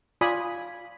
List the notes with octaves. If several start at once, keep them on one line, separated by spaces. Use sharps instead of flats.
F4 D5 G#5 B5 D#6